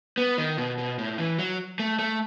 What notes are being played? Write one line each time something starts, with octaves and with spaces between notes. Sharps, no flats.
B3
D#3
B2
B2
A2
E3
F#3
A3
A3